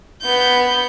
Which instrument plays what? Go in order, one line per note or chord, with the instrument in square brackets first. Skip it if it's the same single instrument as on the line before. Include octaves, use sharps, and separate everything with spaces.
[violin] B3 G6